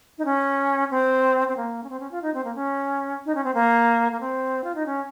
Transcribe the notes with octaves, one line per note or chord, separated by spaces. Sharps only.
D#4
C#4
C4
C4
A#3
C#4
C4
C#4
F4
D#4
C4
A#3
C#4
D#4
C#4
C4
A#3
A#3
C4
F4
D#4
C#4